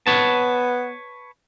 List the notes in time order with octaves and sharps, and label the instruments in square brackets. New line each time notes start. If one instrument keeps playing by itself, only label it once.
[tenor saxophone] B3 [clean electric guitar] B4 C#5 A5